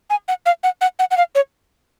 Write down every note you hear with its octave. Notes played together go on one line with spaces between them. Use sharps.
G#5
F#5
F5
F#5
F#5
F#5
F#5
F5
C#5